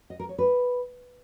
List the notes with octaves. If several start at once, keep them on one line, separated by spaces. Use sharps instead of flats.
D#5
A#4
C#5
B4